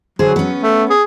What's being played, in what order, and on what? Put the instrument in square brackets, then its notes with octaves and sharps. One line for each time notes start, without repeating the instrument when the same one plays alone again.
[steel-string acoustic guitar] D3 G#4 C5 [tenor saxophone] F#3
[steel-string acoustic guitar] B3 C#4
[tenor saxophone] A3
G#4